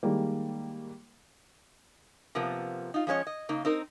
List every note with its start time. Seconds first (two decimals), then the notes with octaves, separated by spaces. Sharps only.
0.03 D#3 G3 G#3 A#3
2.35 C3 F3 A#3 B3
2.94 D#4 F4
3.07 F3 G#3 C#4 C#5 D#5
3.27 D#5
3.49 C#3 A#3 D#4
3.65 C4 D#4 A#4